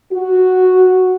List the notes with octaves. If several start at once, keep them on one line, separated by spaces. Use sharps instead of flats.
F#4